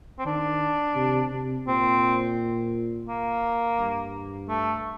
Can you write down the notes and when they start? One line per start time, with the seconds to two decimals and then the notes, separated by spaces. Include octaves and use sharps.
0.19 C4
0.25 D#3 D4
0.95 C3
1.31 C3
1.67 A#2 C4
3.09 A#3
3.79 G2
4.49 A3